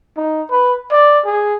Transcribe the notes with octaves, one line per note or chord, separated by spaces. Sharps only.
D#4
B4
D5
G#4